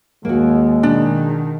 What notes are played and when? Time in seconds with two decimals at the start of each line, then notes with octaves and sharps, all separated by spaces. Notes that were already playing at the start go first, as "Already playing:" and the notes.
0.25 D#2 G#3 A#3 F#4
0.83 B2 D#3 D4